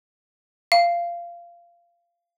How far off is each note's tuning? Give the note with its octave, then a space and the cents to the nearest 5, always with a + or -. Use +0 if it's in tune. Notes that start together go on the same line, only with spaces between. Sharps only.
F5 -20